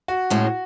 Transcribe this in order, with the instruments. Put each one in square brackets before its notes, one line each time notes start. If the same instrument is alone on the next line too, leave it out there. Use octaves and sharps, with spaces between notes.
[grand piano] F#4
[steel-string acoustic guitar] A2 G#3 C#4